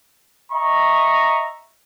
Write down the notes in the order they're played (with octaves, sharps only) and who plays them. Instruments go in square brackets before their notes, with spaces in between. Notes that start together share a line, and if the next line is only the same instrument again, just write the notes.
[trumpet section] D#5 E5 A#5 C#6